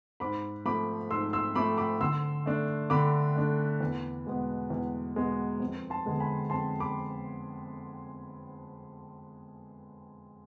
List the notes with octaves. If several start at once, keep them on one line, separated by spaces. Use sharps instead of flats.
G#2 B5 D6
F3 A3 B5 D6
G#2 C6 E6
C6 E6
F3 A3 B5 D6
B5 D6
D3 C6 E6
A3 D4
D3 B5 D6
A3 D4
E2
B2 G#3 B3
E2
B2 G#3 B3
F2
A5 C6
D3 G#3 B3
G#5 B5
F2 A5 C6
B5 D6